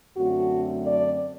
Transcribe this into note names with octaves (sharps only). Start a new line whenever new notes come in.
F#2 D3 F#3 A3 C4 F#4
D5